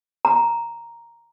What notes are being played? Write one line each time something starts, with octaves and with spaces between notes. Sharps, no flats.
A#5